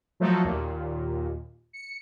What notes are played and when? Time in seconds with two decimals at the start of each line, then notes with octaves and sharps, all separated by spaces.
0.20 F3 F#3 A3 D#4 F#4 A4
0.44 D#2 A#2
1.73 C#7